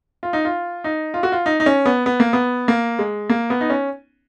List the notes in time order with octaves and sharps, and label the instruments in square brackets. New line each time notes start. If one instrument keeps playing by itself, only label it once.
[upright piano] F4
D#4
F4
D#4
F4
F#4
F4
D#4
D#4
C#4
B3
B3
A#3
B3
A#3
G#3
A#3
B3
D#4
C#4